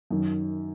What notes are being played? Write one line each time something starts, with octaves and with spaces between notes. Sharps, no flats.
F#2 D#3